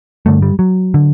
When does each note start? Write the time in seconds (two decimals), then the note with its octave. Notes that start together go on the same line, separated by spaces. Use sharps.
0.26 G2 D3 A3
0.42 G3
0.59 F#3
0.94 D3